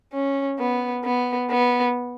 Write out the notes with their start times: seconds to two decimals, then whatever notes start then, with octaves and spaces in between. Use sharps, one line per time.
0.13 C#4
0.59 B3
1.04 B3
1.51 B3